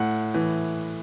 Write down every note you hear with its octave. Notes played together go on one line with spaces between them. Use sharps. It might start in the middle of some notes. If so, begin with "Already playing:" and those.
Already playing: A2 F#5
E3